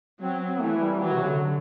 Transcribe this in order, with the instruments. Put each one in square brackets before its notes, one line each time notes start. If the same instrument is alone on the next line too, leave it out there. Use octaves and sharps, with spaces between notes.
[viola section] F#3 [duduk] C4
[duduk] C4
[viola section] E3 [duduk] A3
[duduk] G3
[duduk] E3 [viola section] F#3
[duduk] C3
D3